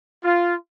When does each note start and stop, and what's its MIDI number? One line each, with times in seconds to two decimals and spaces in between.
0.23 0.54 65